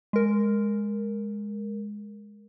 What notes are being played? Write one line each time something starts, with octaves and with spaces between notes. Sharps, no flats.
G#3 A#4